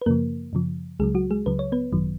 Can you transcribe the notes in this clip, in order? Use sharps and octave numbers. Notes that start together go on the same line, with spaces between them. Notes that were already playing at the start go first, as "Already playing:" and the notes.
B4
F#2 C#3 F3 A#3 A#4
F#2 C#3 F3
C#2 C#3 F#3 G#3 G#4
F#3 F#4
G#3 G#4
C#2 C#3 F#3 B4
C#5
B3 B4
G#1 F#2 D#3 F#3